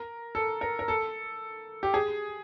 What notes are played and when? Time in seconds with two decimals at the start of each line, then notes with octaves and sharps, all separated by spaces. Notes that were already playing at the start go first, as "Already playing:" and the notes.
Already playing: A#4
0.35 A4
0.61 A#4
0.79 A#4
0.88 A4
1.83 G4
1.94 G#4